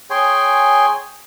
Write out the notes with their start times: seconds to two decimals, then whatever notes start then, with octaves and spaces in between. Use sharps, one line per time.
0.10 G#4 C#5 G5 G#5 C6